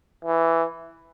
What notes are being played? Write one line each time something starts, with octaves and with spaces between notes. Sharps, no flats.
E3